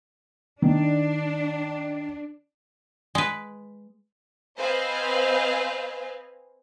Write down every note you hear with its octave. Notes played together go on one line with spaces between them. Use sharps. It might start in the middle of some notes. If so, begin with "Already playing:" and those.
D#3 D4
G#3 B4
C4 B4 C5 D#5 F5 G#5